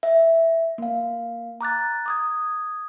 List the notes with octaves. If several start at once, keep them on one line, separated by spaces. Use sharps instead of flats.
E5
A#3 F5
A#5 D6 F#6 A6
D6 D#6 G#6